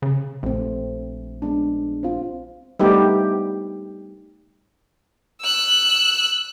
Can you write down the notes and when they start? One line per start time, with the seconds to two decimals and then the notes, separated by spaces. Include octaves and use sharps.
0.02 C#3
0.43 A#1 A3 C4
1.42 G#3 B3 D4
2.03 C4 F4
2.80 G3 A3 B3 D#4 G4
5.42 E6 F#6